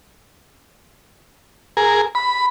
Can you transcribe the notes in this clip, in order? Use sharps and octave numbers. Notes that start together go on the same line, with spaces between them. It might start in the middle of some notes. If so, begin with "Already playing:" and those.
G#4 A#4
B5